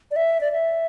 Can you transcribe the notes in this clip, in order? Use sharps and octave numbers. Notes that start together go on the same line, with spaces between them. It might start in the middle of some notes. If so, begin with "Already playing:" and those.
D5
E5
D5
E5